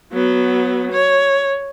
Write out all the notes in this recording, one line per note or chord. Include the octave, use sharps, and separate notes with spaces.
F#3 B3
C#5